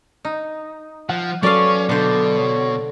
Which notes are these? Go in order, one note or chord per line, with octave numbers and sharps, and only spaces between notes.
D#4
F3 F#5
F#3 C#4 A4 B4 D5 F5 C#6
B2 D3 C5 D5
C#5